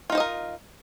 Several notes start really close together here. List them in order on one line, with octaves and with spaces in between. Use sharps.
F4 D#4 C5 D#5 A#4